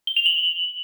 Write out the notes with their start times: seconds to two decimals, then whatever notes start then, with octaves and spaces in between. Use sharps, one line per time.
0.07 G7
0.17 F7
0.26 F#7